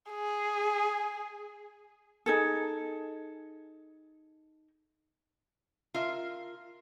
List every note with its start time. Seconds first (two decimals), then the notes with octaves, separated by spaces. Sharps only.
0.11 G#4
2.26 D#4 G#4 A4
5.94 F4 A#4 E5